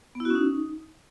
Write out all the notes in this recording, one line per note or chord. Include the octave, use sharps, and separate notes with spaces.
B3
E4
F#4
C#4
D#4